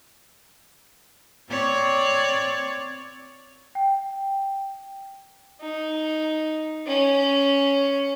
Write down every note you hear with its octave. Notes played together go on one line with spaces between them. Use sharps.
C4 C#5 D5
G5
D#4
C#4